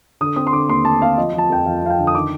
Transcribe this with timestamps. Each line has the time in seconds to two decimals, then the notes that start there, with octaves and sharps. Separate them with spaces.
0.21 D3 D#6
0.36 C4 D#6
0.47 C6
0.53 D3 D6
0.69 D#2 C6
0.85 A3 A5
1.01 C4 F5
1.17 F3 D#5
1.33 F3 A5
1.50 F2 G5
1.66 F3 F5
1.82 F2 F5
1.90 G5
1.99 D3
2.07 D#6
2.15 D#3 D6